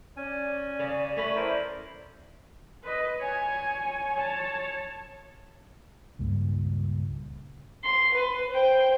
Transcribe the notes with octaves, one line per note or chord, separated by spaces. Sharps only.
C#4 D5 G#5
C#3
A3 C#4 B4
E4 A#4 C5 D5
B4 D#5
C#5 G#5
C#5 A5
C#2 G2 A#2
C6
B4
C5 G5